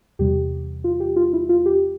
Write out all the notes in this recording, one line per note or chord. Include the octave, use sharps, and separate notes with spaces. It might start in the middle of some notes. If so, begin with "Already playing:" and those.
E2 C3 G3 G4
F4
G4
F4
E4
F4
G4